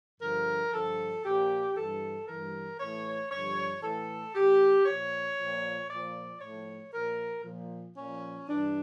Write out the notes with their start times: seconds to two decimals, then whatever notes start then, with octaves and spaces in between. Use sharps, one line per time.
0.21 G2 D3 F3 A#4
0.71 G2 D3 F3 A4
1.24 A#2 F3 G4
1.75 G2 E3 A4
2.27 G2 E3 A#4
2.79 A2 E3 C#5
3.31 G2 D3 F3 C#5
3.82 A2 E3 A4
4.34 A2 E3 G4
4.86 A#2 F3 C#5
5.37 A#2 F3
5.89 A#2 F3 D5
6.40 A2 F3 C#5
6.92 A#2 F3 A#4
7.44 A#2 F3
7.96 A#2 F3 C#4
8.48 G2 E3 D4